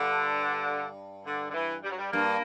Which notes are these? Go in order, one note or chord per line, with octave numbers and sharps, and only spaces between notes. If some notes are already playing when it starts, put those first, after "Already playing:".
Already playing: G2 D3
D3
D3
E3
G3
F#3
G3
G2 A#3